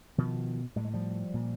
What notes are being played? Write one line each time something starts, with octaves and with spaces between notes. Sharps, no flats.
B2 D#3 F3
A2 G3
G#3
F3 G3
A#2